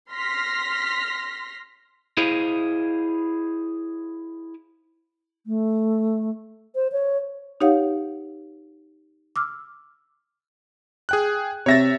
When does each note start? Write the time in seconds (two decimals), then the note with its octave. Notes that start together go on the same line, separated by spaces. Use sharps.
0.11 C6 F6 A#6 B6
2.17 E4 G#4 C5 D#5 F5
5.46 A3
6.75 C5
6.92 C#5
7.60 D#4 G4 C#5 F5 F#5
9.36 D6 E6 F6
11.09 G#4 G5 F#6
11.66 C3 C#5 E5 A6 A#6